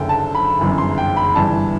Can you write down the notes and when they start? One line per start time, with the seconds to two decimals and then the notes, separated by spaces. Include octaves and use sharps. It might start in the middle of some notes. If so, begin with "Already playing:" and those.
Already playing: F#1 F#2 D3 G5
0.09 A5
0.35 B5
0.59 G1 F#2 E3
0.78 C6
0.98 G5
1.17 B5
1.35 G1 G2 E3 A5